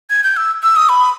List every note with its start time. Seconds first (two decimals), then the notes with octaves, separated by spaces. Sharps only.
0.10 G#6
0.24 G6
0.37 E6
0.63 E6
0.76 D#6
0.89 B5